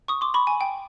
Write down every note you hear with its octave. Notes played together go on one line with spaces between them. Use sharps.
C#6 D#6
C6 D6
B5 C#6
G#5
G5